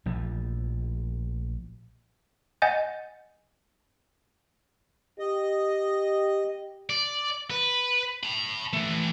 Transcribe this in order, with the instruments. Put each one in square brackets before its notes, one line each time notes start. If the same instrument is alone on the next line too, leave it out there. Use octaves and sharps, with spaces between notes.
[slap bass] A#1 A2 F3
[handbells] D#5 F#5 G#5 G6 A6
[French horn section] G4 [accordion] D#5
[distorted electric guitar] D5
B4
A5 B5
E3 A3